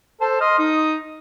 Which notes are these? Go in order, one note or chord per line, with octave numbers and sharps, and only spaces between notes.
A4 C5 A5
D#5 C6 F6
D#4 D#6